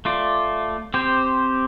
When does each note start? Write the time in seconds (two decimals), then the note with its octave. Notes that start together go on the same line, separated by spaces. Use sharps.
0.05 A3 F4 D5
0.94 C4 G4 C5